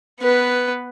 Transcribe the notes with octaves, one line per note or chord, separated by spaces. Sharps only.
B3 B4